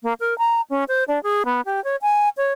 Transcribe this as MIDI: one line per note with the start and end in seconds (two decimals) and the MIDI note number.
0.03 0.13 58
0.20 0.37 70
0.38 0.61 82
0.70 0.84 61
0.88 1.04 72
1.08 1.21 62
1.23 1.43 68
1.46 1.61 59
1.65 1.83 67
1.84 1.96 73
2.02 2.29 80
2.37 2.53 73